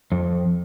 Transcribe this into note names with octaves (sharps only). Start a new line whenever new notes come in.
F2